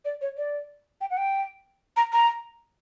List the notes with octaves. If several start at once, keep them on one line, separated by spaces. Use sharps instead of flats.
D5
C#5
D5
G5
F#5
G5
A#5
A#5